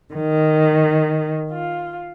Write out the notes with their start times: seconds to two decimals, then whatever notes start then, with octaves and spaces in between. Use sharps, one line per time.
0.14 D#3
1.51 F4